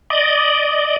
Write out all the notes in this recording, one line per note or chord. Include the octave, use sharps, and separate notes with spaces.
D5 D#5